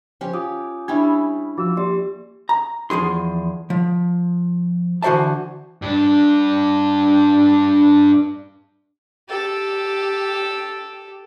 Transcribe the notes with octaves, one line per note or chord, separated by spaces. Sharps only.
F3 C#4 G4 C5
F4 G#5 D6 D#6
G3 C#4 D4 E4 G5
F3 F4 F#4 E6
A#3 G4 D5 C6
A#5
E2 F3 G#4 C6
F3
D3 E3 F#4 C5 E5 A5
G2 D4
G4 A4